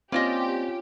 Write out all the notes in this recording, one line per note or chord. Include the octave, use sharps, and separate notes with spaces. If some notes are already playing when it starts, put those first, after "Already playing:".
A#3 C4 C#4 F4 G4 D5 D#5 C6